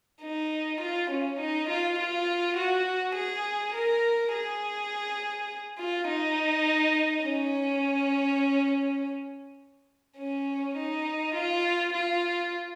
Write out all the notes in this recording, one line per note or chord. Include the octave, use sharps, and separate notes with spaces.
D#4
F4
C#4
D#4
F4
F4
F#4
G#4
A#4
G#4
F4
D#4
C#4
C#4
D#4
F4
F4